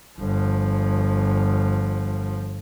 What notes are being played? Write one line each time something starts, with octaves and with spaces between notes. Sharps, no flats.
G1 F3